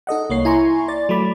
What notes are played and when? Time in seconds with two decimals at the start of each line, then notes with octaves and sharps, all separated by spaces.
0.07 D#4 A4 D#5 F#5
0.30 C2 A#3 C#5 C7
0.45 E4 G#5 A#5 C6 C#6
0.88 D5 A6
1.09 F#3 A3 B5 D6